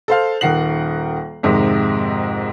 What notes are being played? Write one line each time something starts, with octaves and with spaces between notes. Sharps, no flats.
A4 C5 F5
D#1 D#3 F#5 C7 F#7
F2 G#2 C3 D#3